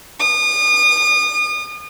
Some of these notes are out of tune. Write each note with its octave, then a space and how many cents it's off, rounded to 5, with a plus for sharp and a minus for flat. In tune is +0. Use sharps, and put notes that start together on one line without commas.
D#6 -35